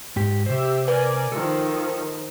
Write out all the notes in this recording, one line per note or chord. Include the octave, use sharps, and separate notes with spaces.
G#2 G4
C3 G4 C5 E5
A#4 B4 D5 G#5
D#3 F3 A4